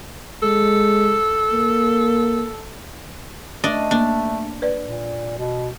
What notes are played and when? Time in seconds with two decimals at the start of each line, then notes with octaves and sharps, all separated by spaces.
0.42 G#3 A4
1.52 A#3
3.64 A3 D4 D5 D#5
3.91 A#3 D4
4.62 B4 D5
4.82 A#2
5.38 B2